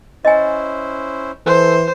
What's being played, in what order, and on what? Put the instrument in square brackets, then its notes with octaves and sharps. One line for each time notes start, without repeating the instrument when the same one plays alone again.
[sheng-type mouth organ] C#4 E4 C5 [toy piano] D#5 G#5
[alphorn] E3 [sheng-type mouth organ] A4 [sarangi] C5